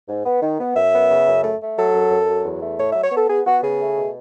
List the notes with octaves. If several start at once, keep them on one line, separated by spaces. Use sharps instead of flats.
G#2
B3
D#3
B3
F#2 E5
B3
C#3
F#2
A3
A3
F#3 A4
F#2
F#2
F#3
E2
A3
A2 C#5
F#3 E5
C#5
B3 A4
B3 G#4
B3 F#4
C#3 G#4
A3
B2